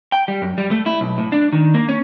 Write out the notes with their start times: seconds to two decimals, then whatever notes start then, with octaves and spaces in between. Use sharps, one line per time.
0.12 G5
0.28 G3
0.42 F#2
0.58 G3
0.71 A3
0.86 E4
1.01 B1
1.18 A2
1.32 D4
1.53 D#3
1.74 A#3
1.89 C#4